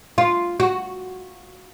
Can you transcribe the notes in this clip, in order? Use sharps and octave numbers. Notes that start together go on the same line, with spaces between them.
F4
F#4